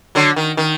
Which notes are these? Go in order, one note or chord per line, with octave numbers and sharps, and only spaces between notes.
D3 F#3
D#3
D#3